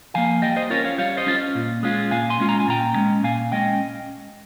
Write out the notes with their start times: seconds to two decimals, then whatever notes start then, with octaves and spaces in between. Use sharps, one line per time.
0.14 F3 A#3 F5 G#5
0.42 G3 D#5 G5
0.57 C5 D#5
0.70 C#4 F4 A#4 C#5
0.84 C#5 F5
0.98 G3 C#5 F5
1.17 C5 D#5
1.27 C#4 F4
1.55 A#2
1.83 G#3 C#4 F4
2.11 A#2 F5 G#5
2.30 G#5 C6
2.40 G#3 C#4 F4
2.49 A#5
2.60 G#5
2.68 A#2 G5 A#5
2.96 G#3 C#4
3.24 A#2 F5 G#5
3.52 G#3 C#4 D#5 G5